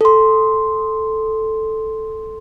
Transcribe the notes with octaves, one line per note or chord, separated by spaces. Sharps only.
A4 C6